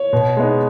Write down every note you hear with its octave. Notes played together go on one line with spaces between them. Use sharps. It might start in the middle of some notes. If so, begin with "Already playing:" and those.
Already playing: C#5
B2
G#3 B3 D#4